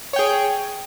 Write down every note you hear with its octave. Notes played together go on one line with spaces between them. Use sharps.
G#4 C#5 G5